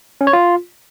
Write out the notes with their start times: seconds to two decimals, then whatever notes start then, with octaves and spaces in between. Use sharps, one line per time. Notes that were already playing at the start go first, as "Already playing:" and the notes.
0.21 C#4
0.27 C#5
0.33 F4